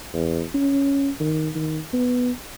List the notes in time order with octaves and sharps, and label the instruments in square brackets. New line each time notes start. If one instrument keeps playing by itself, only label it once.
[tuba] E2
C#4
D#3
D#3
B3